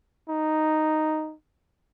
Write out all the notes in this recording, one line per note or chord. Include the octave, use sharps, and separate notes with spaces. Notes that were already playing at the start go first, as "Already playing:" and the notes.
D#4